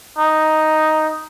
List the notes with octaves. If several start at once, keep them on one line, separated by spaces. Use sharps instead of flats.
D#4